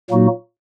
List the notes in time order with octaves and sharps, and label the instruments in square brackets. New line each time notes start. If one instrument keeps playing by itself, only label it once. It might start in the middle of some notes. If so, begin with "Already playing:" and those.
[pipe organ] A#2 F#3 A#3 D#4 F#4